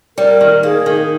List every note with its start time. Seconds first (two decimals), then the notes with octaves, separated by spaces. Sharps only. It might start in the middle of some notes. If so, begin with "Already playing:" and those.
0.17 G3 A#4
0.41 D#3
0.63 A#3 G#4
0.86 D#3